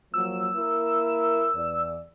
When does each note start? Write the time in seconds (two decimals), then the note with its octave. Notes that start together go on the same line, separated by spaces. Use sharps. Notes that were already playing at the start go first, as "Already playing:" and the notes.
0.14 F3 F#3 A#3 E6
0.55 A#3 E4 A#4
1.56 E2 D5